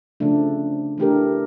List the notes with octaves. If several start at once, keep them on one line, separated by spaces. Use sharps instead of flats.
C#3 F3 A3 D4
E3 A3 D4 G4 A#4